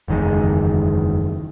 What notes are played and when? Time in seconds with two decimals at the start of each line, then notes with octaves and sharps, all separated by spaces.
0.08 F#1 E2 D#3 G#3